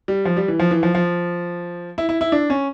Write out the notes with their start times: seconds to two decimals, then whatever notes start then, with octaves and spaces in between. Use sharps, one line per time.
0.08 G3
0.25 F3
0.37 G3
0.48 E3
0.59 F3
0.71 E3
0.83 F3
0.95 F3
1.98 E4
2.09 E4
2.21 E4
2.32 D4
2.50 C#4